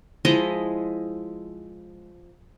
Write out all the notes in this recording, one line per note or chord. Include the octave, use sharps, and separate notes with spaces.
F3 G#3 E4 D#5